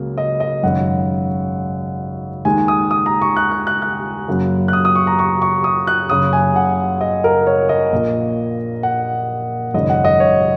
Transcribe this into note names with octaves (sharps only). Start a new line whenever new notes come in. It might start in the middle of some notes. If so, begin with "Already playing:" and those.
Already playing: C#2 C#3 F#3 A#3
D#5
D#5
G#1 F#2 C#3 F#5
D#2 D#3 G#3 G#5
D#6
D#6
A#5
C#6
F#6
F#6
F#6
F#6
F#2 C#3 F#3 A#3
F#6
D#6
D#6
C#6
A#5
C#6
C#6
D#6
F#6
F#1 F#2 C#3 D#6
G#5
F#5
D#5
A#4
C#5
D#5
A#1 A#2 A#3
F#5
G#1 F#2 C#3 D#5
F#5
D#5
C#5